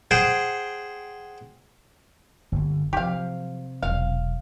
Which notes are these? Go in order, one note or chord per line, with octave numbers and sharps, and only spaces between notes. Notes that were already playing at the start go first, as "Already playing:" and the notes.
G#4 C5 F#5 G5
G1 D3 A#3
C3 F3 F#3 G4 F5
E1 F#3 F5